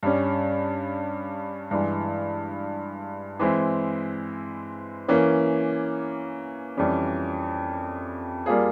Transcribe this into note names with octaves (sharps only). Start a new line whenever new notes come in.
G2 G3 C#4
G2 E3 G#3
E3 G#3 C4 E4
E3 A#3 C#4
F2 E3 G3 C#4
G3 A#3 F4 G#4